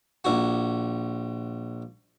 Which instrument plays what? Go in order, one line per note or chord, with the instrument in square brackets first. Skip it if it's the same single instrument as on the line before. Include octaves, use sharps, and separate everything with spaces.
[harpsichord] A#1 F#4